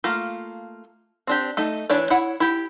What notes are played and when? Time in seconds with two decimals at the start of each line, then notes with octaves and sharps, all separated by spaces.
0.04 A3 A#3 F4
1.27 C4 D4 G4
1.57 A3 D#4 A4
1.90 E3 D4 C#5 D5
2.10 E4 C#5 F#5
2.40 E4 G4